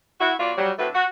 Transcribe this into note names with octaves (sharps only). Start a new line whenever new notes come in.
E4 F#4
B2 F#3 F4 F#4 D5
F#3 G3
A2 D3 A3 C4 F#4 B4
F#4